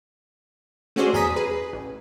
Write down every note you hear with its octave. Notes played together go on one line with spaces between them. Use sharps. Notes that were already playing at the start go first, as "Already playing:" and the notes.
A3 C#4 F#4 G#4 C5 D5
G1 E2 G#5 A#5 D#6 B6
G#4 B4
A1